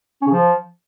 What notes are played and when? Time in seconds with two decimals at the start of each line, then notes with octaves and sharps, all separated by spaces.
0.22 C#4
0.27 C#3
0.32 F3